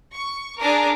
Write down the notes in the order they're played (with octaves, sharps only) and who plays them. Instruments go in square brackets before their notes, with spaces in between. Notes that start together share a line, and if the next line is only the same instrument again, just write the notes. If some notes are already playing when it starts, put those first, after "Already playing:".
[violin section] C#6
D4 G#4 A#4 A#5 D6